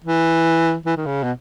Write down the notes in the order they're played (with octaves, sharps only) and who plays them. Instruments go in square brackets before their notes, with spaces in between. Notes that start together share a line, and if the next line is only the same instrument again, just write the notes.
[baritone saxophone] E3
E3
D#3
C#3
B2